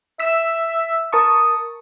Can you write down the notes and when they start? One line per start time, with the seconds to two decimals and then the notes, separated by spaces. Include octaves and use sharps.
0.20 E5 E6 B6
1.13 A#4 A5 C#6 D#6